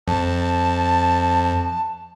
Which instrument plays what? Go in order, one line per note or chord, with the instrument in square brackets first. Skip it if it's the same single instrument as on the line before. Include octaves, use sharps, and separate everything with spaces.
[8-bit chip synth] F2 [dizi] A5